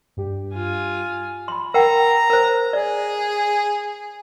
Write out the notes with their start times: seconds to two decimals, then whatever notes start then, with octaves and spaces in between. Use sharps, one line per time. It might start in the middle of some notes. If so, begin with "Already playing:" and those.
0.17 G2 G4
0.54 F4 G#5
1.48 B5 C6
1.74 A#4 F#5 G5 A#5
2.30 A#4 C5
2.73 G#4 D5